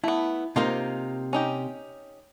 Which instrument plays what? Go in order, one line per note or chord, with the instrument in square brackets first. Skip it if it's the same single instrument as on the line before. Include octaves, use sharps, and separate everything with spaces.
[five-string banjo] A3 B3 [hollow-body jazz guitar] E4
[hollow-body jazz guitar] C3 A#3 [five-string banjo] D#4 F4 C5
[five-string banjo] C#4 D#4 G4